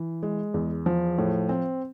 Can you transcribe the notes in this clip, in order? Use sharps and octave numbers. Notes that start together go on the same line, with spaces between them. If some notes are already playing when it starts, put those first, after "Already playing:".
Already playing: E3
G#3
E2
F3
A2
C4